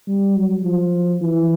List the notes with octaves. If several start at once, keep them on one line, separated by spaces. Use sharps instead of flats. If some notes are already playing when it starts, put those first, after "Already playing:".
G3
F#3
F3
E3